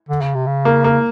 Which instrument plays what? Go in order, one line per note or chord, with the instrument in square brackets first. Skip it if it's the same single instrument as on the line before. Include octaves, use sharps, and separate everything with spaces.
[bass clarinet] D3
C#3
C3
C#3
[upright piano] A#3
A#3